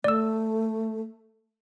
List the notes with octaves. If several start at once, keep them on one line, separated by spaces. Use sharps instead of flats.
A3 D5 E6